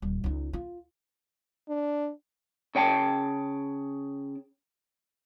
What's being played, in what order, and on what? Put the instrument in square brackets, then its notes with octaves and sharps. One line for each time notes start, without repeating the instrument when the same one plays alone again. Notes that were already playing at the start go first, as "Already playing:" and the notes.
[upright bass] D#1 G3
C#2 D#4
F4
[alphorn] D4
[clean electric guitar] C#3 C#5 G5 A5